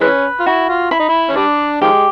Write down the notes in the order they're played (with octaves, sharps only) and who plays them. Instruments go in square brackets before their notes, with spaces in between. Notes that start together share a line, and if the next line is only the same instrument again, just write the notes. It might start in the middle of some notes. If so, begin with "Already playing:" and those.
[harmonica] E3 G#3 C#4 [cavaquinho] B4
[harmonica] F4
[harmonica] E4 [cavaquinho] F#4
[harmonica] F4
[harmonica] E4 [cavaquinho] B5
[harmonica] D#4
E4
C#4
[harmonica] G3 D4 [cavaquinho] D5
[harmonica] D#3 F3 G#3 [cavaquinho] G4